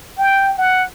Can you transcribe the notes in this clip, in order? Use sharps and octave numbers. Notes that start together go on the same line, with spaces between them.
G5
F#5